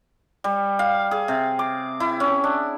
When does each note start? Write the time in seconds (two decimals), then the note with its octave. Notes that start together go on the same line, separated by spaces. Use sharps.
0.44 G3
0.79 F5
1.11 G#4
1.28 C3
1.59 D6
2.00 E4
2.20 C#4
2.44 D4